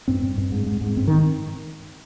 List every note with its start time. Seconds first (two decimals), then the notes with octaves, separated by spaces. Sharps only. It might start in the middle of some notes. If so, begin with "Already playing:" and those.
0.08 G2 C4
0.23 G2
0.38 G2
0.52 G#2
0.66 G#2
0.81 G#2
0.97 G2 C4
1.08 D#3